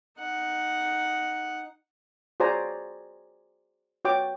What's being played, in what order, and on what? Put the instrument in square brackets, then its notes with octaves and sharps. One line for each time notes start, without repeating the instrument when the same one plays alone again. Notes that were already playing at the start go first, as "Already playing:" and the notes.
[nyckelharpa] D#4 F#5
[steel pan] F#4 G#4 C5 D5 G#5 A#5
F#4 C#5 G5 D6